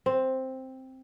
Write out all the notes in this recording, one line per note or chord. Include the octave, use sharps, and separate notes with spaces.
C4